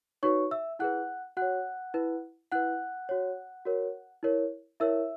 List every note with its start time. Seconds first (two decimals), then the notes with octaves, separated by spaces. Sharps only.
0.23 D#4 F#4 B4 C#5 C#6
0.51 E5 E6
0.79 E4 G#4 B4 F#5 F#6
1.37 F#4 C#5 F#5 F#6
1.94 E4 B4
2.51 E4 B4 F#5 F#6
3.09 F#4 C#5
3.65 F#4 A#4 C#5
4.23 E4 A#4 C#5
4.80 E4 A#4 C#5 E5 E6